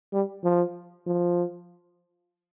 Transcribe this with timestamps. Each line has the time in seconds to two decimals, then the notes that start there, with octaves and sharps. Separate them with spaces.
0.13 G3
0.44 F3
1.07 F3